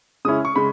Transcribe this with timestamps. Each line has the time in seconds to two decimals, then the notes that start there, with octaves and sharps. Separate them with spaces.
0.25 C#3 G#3 C#4 E4 D#6
0.45 C#6
0.56 C#3 G#3 B5